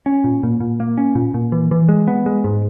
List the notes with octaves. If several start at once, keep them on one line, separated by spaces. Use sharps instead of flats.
C#4
A#2
A#2
A#2
A#3
C#4
A#2
A#2
E3
E3
G#3
B3
G#3
G#2